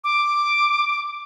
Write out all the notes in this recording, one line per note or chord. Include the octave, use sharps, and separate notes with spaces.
D6